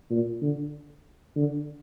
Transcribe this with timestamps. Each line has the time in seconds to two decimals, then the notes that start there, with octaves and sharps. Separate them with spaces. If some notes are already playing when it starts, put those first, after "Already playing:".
0.10 A#2
0.42 D3
1.36 D3